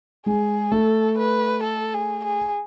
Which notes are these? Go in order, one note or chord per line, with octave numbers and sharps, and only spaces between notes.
G#3 G#4
A3 A4
B4
A4
G#4
G#4